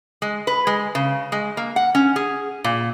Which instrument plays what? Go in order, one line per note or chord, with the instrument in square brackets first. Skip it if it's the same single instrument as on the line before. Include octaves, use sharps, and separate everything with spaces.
[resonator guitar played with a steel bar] G#3
B4
G#3
C#3
G#3
A#3
F#5
C#4
G#4
A#2